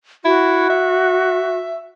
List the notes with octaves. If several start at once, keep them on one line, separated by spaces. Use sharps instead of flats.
E4 F#4
E5